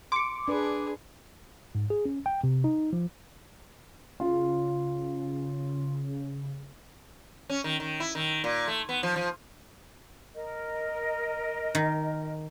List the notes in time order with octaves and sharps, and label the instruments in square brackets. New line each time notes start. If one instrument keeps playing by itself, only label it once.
[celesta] C6 C#7 [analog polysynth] D6
[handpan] D4 B4 [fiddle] G#4
[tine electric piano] G#2
G#4
C#4
G5
C3
D#4
F3
[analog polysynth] C#3 [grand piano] F4
[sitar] C#4
D#3
D#3
E4
D#3
A#2
A3
B3
F3
F3
[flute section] A#4 D#5
[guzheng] D#3